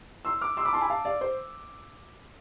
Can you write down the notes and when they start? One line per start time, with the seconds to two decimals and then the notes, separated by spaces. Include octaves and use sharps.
0.25 C6 E6
0.41 D6 F6
0.57 C6 E6
0.65 B5 D6
0.73 A5 C6
0.81 G#5 B5
0.89 F5 A5
1.05 D5 F5
1.21 C5